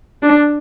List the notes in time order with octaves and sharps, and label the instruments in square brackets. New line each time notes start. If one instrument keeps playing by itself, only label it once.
[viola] D4